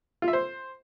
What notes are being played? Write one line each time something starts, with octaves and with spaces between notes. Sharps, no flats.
F4
E5
C5